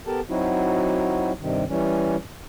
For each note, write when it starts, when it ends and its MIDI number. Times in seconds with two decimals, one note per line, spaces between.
0.07 0.20 59
0.07 0.20 67
0.07 0.20 69
0.07 0.20 70
0.07 0.20 81
0.29 1.32 54
0.29 1.32 60
0.29 1.32 63
0.29 1.32 64
0.29 1.32 66
1.41 1.64 43
1.41 1.64 48
1.41 1.64 51
1.69 2.16 52
1.69 2.16 55
1.69 2.16 61